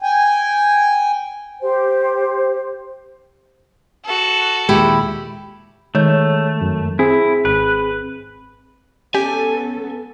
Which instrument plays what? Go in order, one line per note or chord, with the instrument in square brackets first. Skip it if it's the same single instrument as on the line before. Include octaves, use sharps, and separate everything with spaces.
[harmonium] G5 G#5
[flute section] G4 C5
[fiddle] F#4 A4
[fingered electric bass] D#2 A#2 G#3 [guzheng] E4 [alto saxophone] G4
[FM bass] D#3 [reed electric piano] G#3 C#5 G6 [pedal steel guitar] A3
[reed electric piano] F#2
[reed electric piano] C4 G#4 [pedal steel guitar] E4
[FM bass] G#1 [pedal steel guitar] B4
[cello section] B3 A4 [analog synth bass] C#4 [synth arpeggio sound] G4 [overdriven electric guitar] G#5